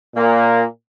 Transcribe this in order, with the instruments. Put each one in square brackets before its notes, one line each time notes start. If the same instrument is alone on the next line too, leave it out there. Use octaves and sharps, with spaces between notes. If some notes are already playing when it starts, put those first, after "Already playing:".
[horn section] A#2 A#3